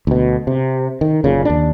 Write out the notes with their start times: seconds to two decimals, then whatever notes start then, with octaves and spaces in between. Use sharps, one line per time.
0.07 D2 B2
0.47 C3
1.01 D#3
1.24 F#1 A#2 C#3
1.45 D#2 D4